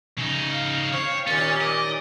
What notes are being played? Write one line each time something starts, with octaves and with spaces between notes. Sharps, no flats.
C#3 D#4
F5
C4 C#5
D#2 A#2 C#4 A6
D5 D#5 D6